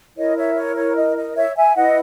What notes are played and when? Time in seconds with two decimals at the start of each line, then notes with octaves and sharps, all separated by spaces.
0.16 E4 A#4 C#5 D#5
0.36 C#5 E5
0.56 C#5
0.76 C#5
0.96 D#5
1.16 D#5
1.36 C#5 E5
1.56 E5 G#5
1.76 E4 B4 D#5 F#5